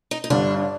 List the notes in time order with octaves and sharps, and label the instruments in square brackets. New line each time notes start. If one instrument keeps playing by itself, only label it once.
[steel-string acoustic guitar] D#4
D#4
[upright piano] G1 G2 D3 [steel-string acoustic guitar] D4